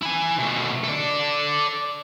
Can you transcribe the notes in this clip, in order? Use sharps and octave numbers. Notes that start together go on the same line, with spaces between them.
E4 G#5
B2 A3
A4 D5